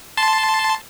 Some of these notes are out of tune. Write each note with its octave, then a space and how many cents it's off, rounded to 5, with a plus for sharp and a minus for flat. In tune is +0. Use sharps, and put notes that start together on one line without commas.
A5 -5 C6 +0